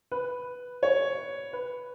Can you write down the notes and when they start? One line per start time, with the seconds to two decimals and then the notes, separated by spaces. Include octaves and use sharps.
0.12 B4
0.83 C#5
1.53 B4